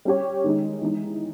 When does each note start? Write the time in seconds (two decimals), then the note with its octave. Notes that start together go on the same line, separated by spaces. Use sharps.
0.05 G3 C#4 G4 C#5
0.44 D#3 G#3 D#4
0.82 E3 G#3 D#4